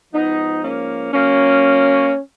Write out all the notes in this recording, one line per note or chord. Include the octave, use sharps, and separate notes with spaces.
G#2 F3 B3 D#4
A#3 C#4
F#3 A#3 C#4